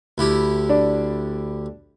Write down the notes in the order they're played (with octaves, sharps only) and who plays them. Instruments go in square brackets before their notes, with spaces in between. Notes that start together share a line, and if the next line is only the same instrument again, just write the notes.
[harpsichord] D2 E4 G4
[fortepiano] D4